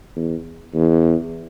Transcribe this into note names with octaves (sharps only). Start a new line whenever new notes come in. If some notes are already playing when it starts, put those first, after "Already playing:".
E2
E2